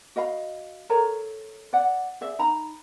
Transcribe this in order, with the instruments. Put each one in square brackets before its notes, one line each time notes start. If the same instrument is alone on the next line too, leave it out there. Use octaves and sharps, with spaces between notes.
[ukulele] F#4 D#5 F5 B5
A4 A#4 C#5 A#5
D5 F#5
G#4 D5 E5
D#4 A#5 B5